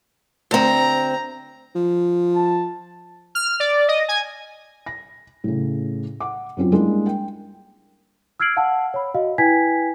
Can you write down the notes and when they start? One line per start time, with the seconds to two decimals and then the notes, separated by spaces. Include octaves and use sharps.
0.51 D2 C4 A#5
1.75 F3
2.36 A5
3.35 F6
3.60 D5
3.88 D#5
4.08 G#5
4.86 A#6
5.44 A2 C#3
6.20 F#5 D6
6.57 F#2 C4 C#4 F4
6.72 G3 G#3 A#3 D4 E4 G#4
7.07 G5
8.40 E6 F6 G#6 C7 D7 F#7
8.57 F5 F#5 A5 E6
8.94 C#5 B5
9.14 F#4 D#5 F5
9.38 E4 B4 G5 G#5 G#6 B6